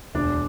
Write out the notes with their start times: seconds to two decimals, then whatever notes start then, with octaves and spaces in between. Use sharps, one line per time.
0.15 E1 D2 D3 D4